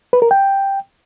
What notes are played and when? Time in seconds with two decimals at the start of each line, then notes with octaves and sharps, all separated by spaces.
0.13 B4
0.22 A#4
0.31 G5